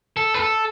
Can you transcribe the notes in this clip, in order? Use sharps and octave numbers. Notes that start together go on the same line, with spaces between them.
A4
B4
A4